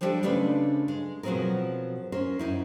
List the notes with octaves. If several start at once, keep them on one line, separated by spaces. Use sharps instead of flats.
F3 G3 B3 D4 G4 A4
C#3 G#3 A3 D4 B4
G#3
B2 F3 F#3 C4 G#4 A#4
C#4 A#4 C5
F#2 D#4 E4